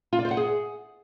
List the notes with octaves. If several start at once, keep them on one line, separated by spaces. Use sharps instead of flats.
F4
D5
C5
F#5
G#4